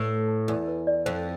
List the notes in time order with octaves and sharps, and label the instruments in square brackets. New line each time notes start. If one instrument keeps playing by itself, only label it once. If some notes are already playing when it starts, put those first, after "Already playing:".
Already playing: [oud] A2 [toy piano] B4
[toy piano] A5
A5
[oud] E2 [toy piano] B4
[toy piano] B4
D5
[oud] F2 [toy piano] C5